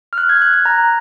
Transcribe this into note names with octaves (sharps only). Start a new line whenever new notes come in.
F6
F#6
G#6
F#6
F#6
A#5